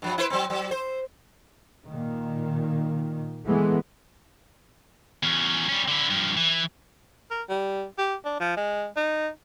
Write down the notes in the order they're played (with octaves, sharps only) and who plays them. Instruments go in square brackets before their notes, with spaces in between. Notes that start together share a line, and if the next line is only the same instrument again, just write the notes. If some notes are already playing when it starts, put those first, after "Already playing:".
[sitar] G2 F3
E4 B4 C5
F#3 C4
F#3
C5
[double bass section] A#2 D#3
E3 G#3 A3 B3
[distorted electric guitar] E2 C#4
G3 C#4
D3 E4
G2 F3
E3
[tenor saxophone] A#4
G3
G4
D4
F3
G#3
D#4